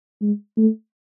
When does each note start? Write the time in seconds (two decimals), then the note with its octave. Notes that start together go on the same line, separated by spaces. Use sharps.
0.22 G#3
0.57 A3